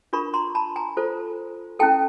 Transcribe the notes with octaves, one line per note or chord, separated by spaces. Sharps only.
D4 F4 A#4 B5 C#6
A#5 C6
A5 B5
G#5 A#5
F4 A4 C5
C#4 E4 A4 G5 A5